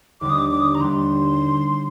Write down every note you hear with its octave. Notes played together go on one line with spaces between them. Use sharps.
D#2 D3 G3 D6
D#6
D6
D6
D#6
D6
A#5
D#2 D3 G3 C6